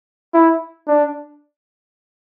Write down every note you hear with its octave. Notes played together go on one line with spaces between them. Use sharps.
E4
D4